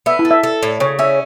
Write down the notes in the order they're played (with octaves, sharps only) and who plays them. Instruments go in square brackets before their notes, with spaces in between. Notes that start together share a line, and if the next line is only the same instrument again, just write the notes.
[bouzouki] B3 [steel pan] E5
[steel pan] E4
[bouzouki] A4
[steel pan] E5
[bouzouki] A4
A2
[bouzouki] C#3 [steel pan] C#5
[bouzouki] C#4 [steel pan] E5